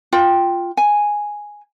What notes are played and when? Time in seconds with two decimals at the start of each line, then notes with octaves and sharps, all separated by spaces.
0.13 F4 G5
0.77 G#5